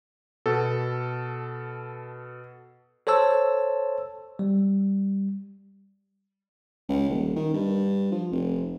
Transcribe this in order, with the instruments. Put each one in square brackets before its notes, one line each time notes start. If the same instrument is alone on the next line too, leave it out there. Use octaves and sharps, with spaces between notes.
[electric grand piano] B2 A4
[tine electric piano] A4 C5 C#5 A5 E6
G3
[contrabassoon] C#2
D#1
D#3
G2
F3
F1